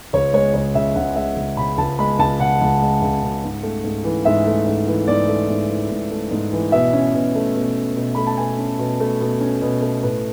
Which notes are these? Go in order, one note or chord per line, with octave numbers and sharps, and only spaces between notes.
C#2 C#5
G#3 C#5
C#2 C#5
C#3 E5
C#2 F#5
G#3 E5
C#2
C#3 B5
C#2 A5
G#3 B5
C#2 A5
C#3 F#5
C#2
G#3
C#2
C#3
G#2
A3
G#2
E3
G#2 E5
A3
G#2
E3
G#2 D5
A3
G#2
E3
G#2
A3
G#2
E3
B2 E5
C#4
B2
A3
B2
C#4
B2
A3 B5
A5
B2 G#5
C#4
B2
A3
B2
C#4
B2
A3
A2 B4